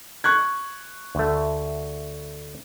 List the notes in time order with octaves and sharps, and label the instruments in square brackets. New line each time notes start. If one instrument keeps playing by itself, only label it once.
[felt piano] C#6 F#6 G#6
[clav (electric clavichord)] D2 A3